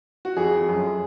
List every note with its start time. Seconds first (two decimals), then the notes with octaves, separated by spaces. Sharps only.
0.25 F#4
0.37 F2 G#4
0.52 F2
0.68 F#2